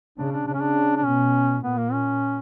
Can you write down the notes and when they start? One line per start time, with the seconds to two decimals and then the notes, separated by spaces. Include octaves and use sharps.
0.18 C#3 D4
0.32 D4
0.47 C#3 D4
0.54 C#4
0.61 D4
0.96 D4
1.05 B2 C#4
1.63 A#2 B3
1.78 A#3
1.92 C#4